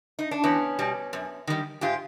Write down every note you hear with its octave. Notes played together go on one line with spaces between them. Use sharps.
D#4
D4
E2 B3 C#4
B2 G3
F#2
D#3 G3
G#2 F4 G4